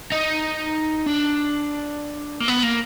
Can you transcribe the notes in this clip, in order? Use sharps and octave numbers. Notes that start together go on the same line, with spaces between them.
D#4
D4
A#3
B3
A#3